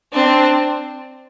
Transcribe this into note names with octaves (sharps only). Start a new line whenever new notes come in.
C4 D4